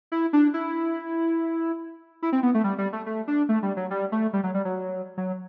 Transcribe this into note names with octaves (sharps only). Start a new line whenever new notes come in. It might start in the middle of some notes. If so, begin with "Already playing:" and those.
E4
D4
E4
E4
C4
B3
A3
G3
G3
A3
A3
D4
A3
G3
F#3
G3
A3
G3
F#3
G3
F#3
F#3